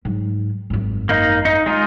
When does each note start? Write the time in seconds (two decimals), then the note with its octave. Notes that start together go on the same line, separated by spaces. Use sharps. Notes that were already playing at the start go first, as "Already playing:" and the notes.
0.05 G#2 F#3
0.70 G#1 F#2
1.09 A#3 D#4
1.45 D#4
1.66 G#3 D#4 F4